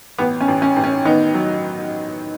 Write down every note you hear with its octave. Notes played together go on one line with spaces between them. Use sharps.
A1 B3
C#4
A1
C#4
A1
C#4
D#3 B3 D#4
F#3